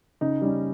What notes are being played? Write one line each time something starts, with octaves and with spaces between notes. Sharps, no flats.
C#3 D#4
G3 C#4